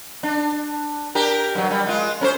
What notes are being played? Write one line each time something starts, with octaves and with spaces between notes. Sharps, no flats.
D4
D4 G4 A#4
G2 F#3
G3
G#3 F4
C#4 A#4 C5